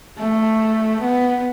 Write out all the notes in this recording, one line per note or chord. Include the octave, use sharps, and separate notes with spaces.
A3
B3